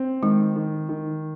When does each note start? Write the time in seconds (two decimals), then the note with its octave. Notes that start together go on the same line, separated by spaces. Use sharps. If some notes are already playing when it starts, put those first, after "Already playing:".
Already playing: C4
0.22 D#3 G#3
0.56 D#3
0.89 D#3